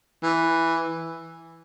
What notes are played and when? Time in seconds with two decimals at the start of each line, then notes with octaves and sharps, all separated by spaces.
0.23 E3